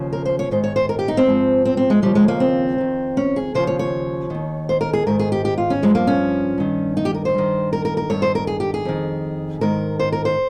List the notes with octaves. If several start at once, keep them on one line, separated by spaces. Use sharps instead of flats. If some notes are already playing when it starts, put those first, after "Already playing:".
Already playing: D#2 C#3 F3
A#4
C5
C#5
G#2 D#3 C5
C#5
C5
A#4
G4
D#4
C4
G#2 F3
C4
C4
G#3
D#2 C#3 F3 G3
G#3
A#3
C4
F2 D#3
C#4
G#4
D#2 C#3 F3 C5
C#5
C#5
D#2 D#3
C5
A#4
G#4
G#2 D#3 A#4
G#4
G4
G4
F4
C#4
G2 F3 G#3
A#3
C#4
G2 D#3
D#4
G4
A#4
C5
G2 D#3
A#4
A#4
A#4
G2 D#3 C#5
C5
A#4
G#4
G4
G#4
F2 D#3
G#2 D#3 A#4
C5
A#4
C5